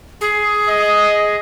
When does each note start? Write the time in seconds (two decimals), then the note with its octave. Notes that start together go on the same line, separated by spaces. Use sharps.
0.21 G#4
0.70 D#5